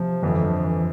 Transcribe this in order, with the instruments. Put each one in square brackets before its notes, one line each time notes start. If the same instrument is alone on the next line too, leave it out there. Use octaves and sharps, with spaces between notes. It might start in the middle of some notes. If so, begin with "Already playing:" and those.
Already playing: [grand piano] C3 [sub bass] F3
[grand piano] G1 F2 D3 [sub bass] E3
[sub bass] F3
E3